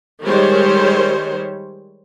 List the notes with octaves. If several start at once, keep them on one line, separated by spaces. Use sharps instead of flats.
D#3 G3 G#3 C5 C#5